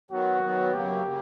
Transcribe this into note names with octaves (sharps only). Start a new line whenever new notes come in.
D#3 F#3 B3 F#4
D#3 F#3 B3
F#2 C#3 F#3 A#3 G4
C#3 A#3